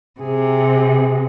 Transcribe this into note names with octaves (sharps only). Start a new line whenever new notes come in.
C3 G#4